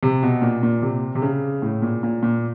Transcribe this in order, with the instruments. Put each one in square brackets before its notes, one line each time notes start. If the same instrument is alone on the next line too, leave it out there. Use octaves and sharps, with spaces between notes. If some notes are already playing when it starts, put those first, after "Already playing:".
[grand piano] C3
B2
A#2
A#2
C3
C3
C#3
A2
A#2
A#2
A#2